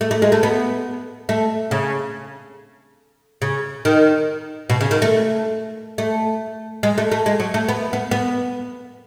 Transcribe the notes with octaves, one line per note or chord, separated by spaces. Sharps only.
A3
A3
G#3
A3
B3
A3
C#3
C#3
D#3
B2
C#3
D#3
A3
A3
G#3
A3
A3
G#3
F#3
A3
B3
B3
B3